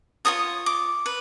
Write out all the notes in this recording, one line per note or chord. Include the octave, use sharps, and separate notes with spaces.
F4 A4 C#5 D#6
D6
B4